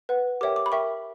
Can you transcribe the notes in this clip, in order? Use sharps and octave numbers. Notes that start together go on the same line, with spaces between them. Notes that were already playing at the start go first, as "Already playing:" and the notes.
B4 F#5
G4 A#4 C#5 E5 G5 D6
D6
B5
A#4 E5 G5 C#6